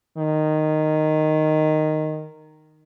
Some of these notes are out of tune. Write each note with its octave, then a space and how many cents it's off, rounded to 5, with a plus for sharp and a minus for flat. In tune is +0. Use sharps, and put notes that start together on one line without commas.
D#3 -10